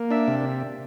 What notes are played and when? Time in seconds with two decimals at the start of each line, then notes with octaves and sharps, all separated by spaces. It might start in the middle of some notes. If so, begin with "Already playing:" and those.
Already playing: A#3
0.11 D4 E5
0.28 C3